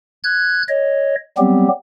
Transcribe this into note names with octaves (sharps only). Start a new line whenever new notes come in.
F#6 G#6
C#5 D#5
F#3 G3 B3 C4 G4